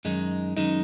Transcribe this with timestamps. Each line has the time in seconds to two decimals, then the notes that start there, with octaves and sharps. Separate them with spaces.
0.05 F#2 D#3 G#3 D#4
0.57 F#2 D#3 G#3 D#4